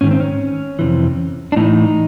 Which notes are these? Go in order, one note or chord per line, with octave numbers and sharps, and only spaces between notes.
G#2 D#3 C#4
C4
C#4
F2 C3 E3
D4
A2 E3 D#4